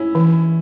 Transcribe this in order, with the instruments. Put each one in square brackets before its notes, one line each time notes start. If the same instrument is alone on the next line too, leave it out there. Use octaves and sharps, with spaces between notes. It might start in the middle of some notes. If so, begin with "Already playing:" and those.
Already playing: [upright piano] C#4 E4
[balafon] E3